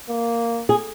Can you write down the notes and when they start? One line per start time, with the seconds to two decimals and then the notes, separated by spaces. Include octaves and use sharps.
0.09 A#3
0.69 G#4